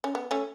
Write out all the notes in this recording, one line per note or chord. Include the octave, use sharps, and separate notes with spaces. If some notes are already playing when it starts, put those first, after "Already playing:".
C#4
B3
A3 C#4